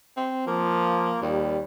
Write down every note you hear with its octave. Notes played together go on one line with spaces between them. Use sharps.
C4
F3 A#3
D#2 G3